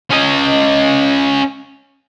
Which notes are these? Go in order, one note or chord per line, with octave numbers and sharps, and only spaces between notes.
C#4 D#5